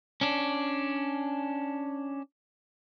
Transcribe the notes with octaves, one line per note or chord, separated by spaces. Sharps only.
C#4 D4